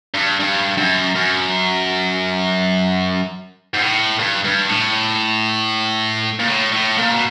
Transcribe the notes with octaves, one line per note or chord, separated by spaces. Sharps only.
G2
G2
F#2
F#2
G#2
A2
G2
G2
A2
A#2
A2
A2
A#2
B2